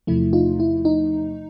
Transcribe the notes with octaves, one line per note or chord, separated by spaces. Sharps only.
E2 C3 F3 A3 E4
D#4 F4
E4
D#4